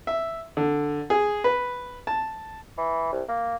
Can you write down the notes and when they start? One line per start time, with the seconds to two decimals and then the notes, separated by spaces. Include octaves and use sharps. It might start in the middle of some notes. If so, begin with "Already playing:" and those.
0.07 E5
0.57 D3
1.10 G#4
1.44 B4
2.07 A5
2.78 E3
3.12 C2
3.29 A#3